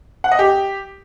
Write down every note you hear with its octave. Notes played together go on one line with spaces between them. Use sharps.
F#5
D#5
G4